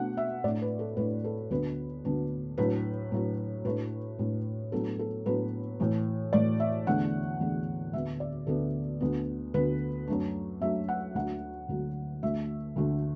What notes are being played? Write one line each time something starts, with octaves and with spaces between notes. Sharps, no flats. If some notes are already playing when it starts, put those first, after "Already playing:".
Already playing: B2 A3 D4 F#5
E5
A2 A3 D4 D5
B4
A4
A2 A3 D4 B4
A4
D2 D3 B3 D4 B4
D2 D3 B3 D4
A2 F#3 D4 B4
A2 F#3 D4
A2 A3 D4 B4
A2 A3 D4
A2 F#3 B3 D4 A4
A4
A2 F#3 B3 D4 B4
A2 E3 A3
A2 E3 A3 D5
E5
E2 D3 A3 D4 F#5
E2 D3 A3 D4
D2 D3 B3 E5
D5
D2 D3 B3 A4
D2 D3 B3
D2 D3 B3 B4
F#2 F#3 A3 D4
F#2 F#3 A3 D4 E5
F#5
D2 D3 F#3 A3 F#5
D2 D3 F#3 A3
D2 D3 A3 E5
D2 D3 A3